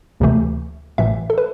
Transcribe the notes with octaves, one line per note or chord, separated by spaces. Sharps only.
D2 C3 E3 A3
A1 A2 E3 E5
A4
B4